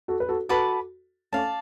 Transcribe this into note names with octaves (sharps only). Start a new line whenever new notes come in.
F#4 A4
B4
F#4 A4
F#4 A4 B4 F#5 A5 D6
A3 C#4 D5 F5 A5